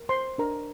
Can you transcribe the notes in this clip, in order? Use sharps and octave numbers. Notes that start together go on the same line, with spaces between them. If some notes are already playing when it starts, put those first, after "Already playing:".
Already playing: A#4
C5 C6
D4 A#4 A#5